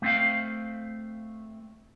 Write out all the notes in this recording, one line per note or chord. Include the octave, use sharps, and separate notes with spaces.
A3 C4 F5